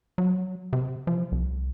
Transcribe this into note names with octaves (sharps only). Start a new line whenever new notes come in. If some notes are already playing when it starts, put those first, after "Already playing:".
F#3
C3
F3
C2